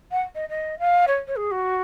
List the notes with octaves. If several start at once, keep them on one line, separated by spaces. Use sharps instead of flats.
F#5
D#5
D#5
F5
C#5
C#5
G#4
F#4